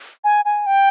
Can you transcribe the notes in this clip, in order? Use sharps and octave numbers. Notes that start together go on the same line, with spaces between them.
G#5
G#5
G5